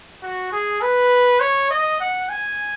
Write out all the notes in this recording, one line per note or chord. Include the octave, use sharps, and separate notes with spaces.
F#4
G#4
B4
C#5
D#5
F#5
G#5